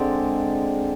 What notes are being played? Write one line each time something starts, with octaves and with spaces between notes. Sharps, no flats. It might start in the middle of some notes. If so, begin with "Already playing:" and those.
Already playing: D3 G#3 C4 D5